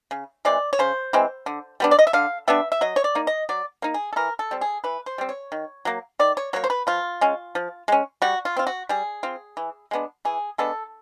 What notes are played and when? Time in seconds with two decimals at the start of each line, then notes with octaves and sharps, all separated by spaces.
0.11 C#3
0.45 E3 G#3 C4 D5
0.73 C#5
0.79 C#3 C5
1.13 E3 G#3 C4
1.46 D3
1.80 G3 B3 D4
1.91 D5
1.99 D#5
2.07 E5
2.13 D3 F5
2.48 G3 B3 D4 E5
2.72 E5
2.81 F#3 D#5
2.96 C#5
3.04 D5
3.15 A#3 D#4
3.27 D#5
3.49 F#3 D5
3.82 A#3 D#4
3.94 G#4
4.13 A4
4.16 E3 A#4
4.39 A4
4.51 G3 C4
4.61 G#4
4.84 E3 B4
5.06 C5
5.18 G3 C4
5.29 C#5
5.52 D#3
5.85 F#3 A#3
6.19 D#3 D5
6.37 C#5
6.53 F#3 A#3 C#5
6.64 C5
6.70 B4
6.87 F3 F4
7.21 G#3 C#4
7.55 F3
7.88 G#3 C#4
8.22 G3 F#4
8.45 F4
8.57 C4 F4
8.67 F#4
8.89 G3 G#4
9.23 C4 F4
9.57 E3
9.91 G#3 B3 D4
10.25 E3 G#4
10.58 G#3 B3 D4 A4